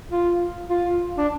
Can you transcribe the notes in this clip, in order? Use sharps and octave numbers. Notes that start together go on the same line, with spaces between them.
F4
F4
D4